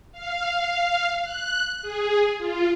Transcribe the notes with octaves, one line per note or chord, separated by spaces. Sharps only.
F5
F5
F#6
G#4
F4